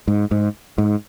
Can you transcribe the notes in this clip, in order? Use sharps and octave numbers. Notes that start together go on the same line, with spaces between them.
G#2
G#2
G#2